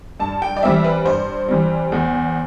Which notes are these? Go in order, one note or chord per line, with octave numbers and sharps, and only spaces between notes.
G2 A5
G5
D5
E3 G3 C4 E5
B4
G2 C5
E3 G3 C4
E2